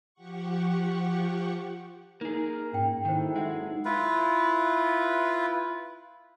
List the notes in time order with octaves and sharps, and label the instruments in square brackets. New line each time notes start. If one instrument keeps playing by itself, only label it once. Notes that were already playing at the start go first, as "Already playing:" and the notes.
[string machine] F3 G4 F#5 C#6
[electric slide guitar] A#3 G#4 [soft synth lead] D#4 [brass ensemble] A#4
[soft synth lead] G#2 [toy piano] C#4 G5
[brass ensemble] F#1 E4 A4 [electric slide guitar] D#3 [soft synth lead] D#4 [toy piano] C5 G5
[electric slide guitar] G#3 [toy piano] E5 F#5
[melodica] E4 F4 B4